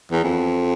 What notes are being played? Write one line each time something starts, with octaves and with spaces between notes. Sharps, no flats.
E2
F2